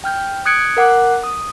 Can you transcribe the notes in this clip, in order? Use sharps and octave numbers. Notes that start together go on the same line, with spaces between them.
G5 F6 G6
D#6 F#6 G#6 C#7 D7
A#4 F#5 D6 F#6
D#6